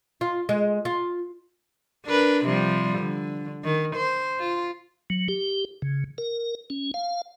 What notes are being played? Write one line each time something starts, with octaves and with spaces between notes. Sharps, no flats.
F4
G#3
F4
D4 A#4 B4
C3 F3 G3
D3
D#3
C5
F4
F#3
G4
C#3
A#4
C#4
F5